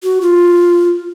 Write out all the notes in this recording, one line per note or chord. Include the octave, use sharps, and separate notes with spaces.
F#4
F4